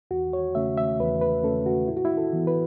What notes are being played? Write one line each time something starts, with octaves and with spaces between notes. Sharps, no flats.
E2 F#4
C#5
C#3 A3 C#4 E5
E5
E2 B4
B4
C#3 A3 C#4 A4
F#4
A2 E4
F#4
E4
A4
E3 B3
B4